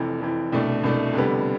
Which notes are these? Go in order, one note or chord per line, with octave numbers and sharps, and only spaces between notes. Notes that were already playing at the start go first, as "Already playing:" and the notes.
Already playing: F1 F2 E3
F1 F2 E3
C2 B2 A3 D4
C2 B2 A3 D4
F1 F2 D3 G3 B3